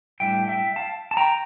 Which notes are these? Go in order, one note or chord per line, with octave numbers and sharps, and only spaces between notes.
A2 G3 D4 E5 G5
E5 G5
F5 A5
A5
G5 A#5